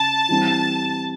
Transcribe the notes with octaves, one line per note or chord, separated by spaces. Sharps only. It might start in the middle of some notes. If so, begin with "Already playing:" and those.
Already playing: C#3 A5
E3 G3 C4